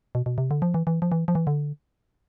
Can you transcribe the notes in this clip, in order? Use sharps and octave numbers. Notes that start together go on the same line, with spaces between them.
B2
B2
C3
D3
F3
E3
E3
F3
E3
F3
E3
D3